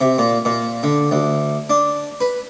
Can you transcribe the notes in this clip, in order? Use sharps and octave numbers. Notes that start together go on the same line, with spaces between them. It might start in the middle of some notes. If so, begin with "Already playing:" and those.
C3
A#2
A#2
D3
D2
D4
B4